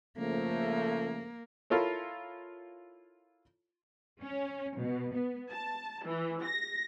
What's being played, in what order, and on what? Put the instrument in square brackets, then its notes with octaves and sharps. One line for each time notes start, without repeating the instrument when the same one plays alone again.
[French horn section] C#3 F3 A3 [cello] A#3
[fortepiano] E4 F4 A4 A#4 C#5
[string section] C#4
B2
B3
A5
E3
A#6